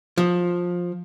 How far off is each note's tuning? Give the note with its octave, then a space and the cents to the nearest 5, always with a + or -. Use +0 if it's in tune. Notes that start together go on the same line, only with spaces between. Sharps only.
F3 +15